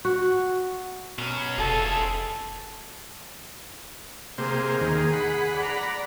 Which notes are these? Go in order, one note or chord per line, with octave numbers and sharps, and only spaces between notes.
F#4
B2 F#3 C#4
F1 F4 G#4 A4
C3 A#3 G#4 C5
D#2 D#3
F#5 B5
D5 A#5